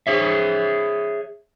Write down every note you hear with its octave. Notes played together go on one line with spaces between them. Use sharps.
G#4 C#5 E5